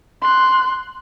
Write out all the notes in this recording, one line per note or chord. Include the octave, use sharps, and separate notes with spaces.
C6 F#6